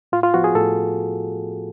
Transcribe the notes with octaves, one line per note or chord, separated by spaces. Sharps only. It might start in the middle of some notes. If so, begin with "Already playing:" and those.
A2 F4
F4
F3 B3 F#4
G#4
A2 A4